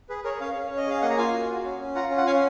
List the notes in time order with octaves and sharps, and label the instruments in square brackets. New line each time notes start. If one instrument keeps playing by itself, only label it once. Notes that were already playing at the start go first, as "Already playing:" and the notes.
[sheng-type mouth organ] G#4 B4
G#4 A#4 C#5
C#4 C#5 F5
C#4
C#5
C#4
D#5
G#4 F5
A#3 D#5 F#5
A#5
F4 F5 G#5
F#4
F#4
C#4
C#4
F4 F#5 A#5
C#4
F#5
C#4 F5 G#5